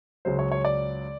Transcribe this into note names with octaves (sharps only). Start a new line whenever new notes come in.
C#2 C#3 F#3 C5
C#5
C#5
D5